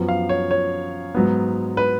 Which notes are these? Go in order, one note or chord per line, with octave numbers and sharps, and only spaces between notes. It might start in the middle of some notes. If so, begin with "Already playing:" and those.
Already playing: F#2 F3 B3
F5
C#5
C#5
G#2 F#3 B3
B4